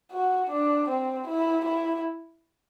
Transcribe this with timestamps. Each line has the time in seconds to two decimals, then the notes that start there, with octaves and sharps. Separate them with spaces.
0.12 F#4
0.51 D4
0.89 C4
1.27 E4
1.66 E4